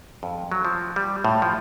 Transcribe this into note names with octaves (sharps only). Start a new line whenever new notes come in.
F2
F#3
F3
G3
A2
F3